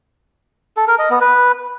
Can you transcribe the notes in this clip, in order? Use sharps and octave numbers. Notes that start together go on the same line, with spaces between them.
A4
A#4
D#5
B3
B4